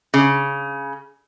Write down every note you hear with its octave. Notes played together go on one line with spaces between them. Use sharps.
C#3